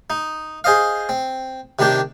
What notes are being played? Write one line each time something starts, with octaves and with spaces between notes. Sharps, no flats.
D#4
G#4 C5 D#5 F5
C4
C3 D#3 C4 D4 G4